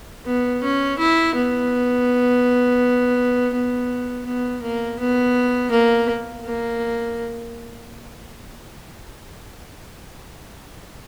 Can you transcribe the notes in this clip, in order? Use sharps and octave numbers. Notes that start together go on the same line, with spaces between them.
B3
C#4
E4
B3
B3
B3
A#3
B3
A#3
A#3